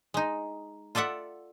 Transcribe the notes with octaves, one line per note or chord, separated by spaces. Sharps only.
G#3 D#4
F4 A4 D5 E5 F#5